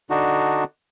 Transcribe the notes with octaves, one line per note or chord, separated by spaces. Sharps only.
D3 D4 D#4 F#4